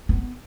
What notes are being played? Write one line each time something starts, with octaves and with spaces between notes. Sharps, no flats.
B3